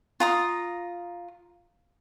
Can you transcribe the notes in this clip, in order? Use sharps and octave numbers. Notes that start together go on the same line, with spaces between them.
F4 A#5 D#6